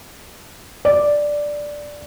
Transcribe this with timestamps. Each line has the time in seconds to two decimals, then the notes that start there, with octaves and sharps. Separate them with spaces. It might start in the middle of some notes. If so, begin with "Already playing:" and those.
0.85 D5